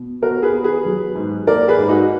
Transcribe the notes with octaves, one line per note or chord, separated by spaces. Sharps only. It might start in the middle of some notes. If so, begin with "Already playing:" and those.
Already playing: B2
B3 F#4 A#4
G#4 B4
B3
G#4 B4
F#3
G#2
A#3 A#4 D5
G#4 B4
G#2
D#4 F#4